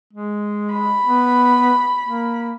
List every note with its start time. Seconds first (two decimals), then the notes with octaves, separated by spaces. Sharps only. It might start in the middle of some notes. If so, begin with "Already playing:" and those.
0.13 G#3
0.73 B5
1.06 B3
2.04 A#3